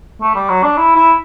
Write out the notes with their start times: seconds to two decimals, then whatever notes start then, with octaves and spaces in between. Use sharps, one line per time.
0.22 A3
0.35 G3
0.49 F#3
0.63 D4
0.77 E4
0.96 E4